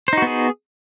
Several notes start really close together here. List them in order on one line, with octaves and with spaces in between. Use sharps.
C5 D#4 F#4 B3 G#4